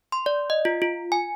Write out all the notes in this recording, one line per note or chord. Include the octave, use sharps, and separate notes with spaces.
C6
D5
D#5
F4
F4
G#5